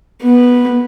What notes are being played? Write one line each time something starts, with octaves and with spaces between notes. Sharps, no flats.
B3